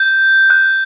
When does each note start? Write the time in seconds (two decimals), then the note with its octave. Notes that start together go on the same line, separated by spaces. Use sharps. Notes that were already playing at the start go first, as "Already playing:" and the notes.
Already playing: G6
0.50 F#6